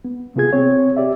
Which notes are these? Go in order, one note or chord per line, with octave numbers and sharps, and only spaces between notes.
B3
C3 B3 F4 G#4 G#6
C4 C#5
G4 D5 E5